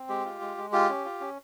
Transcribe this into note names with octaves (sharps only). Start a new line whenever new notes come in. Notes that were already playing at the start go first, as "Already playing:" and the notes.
Already playing: C4
G#3 G4
F4
G#3
G#3
F4 G4
C#4
F4
C#4